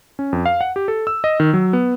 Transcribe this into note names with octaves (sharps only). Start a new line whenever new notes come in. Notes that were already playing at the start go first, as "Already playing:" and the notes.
C#4
F2
F5
F#5
G4
A4
E6
D#5
D#3
F#3
B3